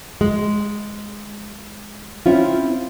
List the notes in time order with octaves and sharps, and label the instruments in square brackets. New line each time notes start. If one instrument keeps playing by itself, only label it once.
[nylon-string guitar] G#3
C4 C#4 E4 F4